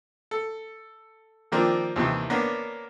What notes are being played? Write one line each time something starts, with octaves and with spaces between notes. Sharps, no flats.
A4
D#3 F3 A#3 C4 D4 F4
D#2 C3 D#3 E3
A#3 B3 C#4 D4